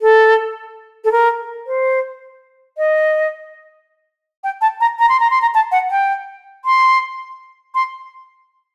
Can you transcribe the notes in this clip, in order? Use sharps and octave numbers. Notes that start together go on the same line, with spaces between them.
A4
A4
A#4
C5
D#5
G5
A5
A#5
A#5
C6
A#5
C6
A#5
A5
F#5
G5
C6
C6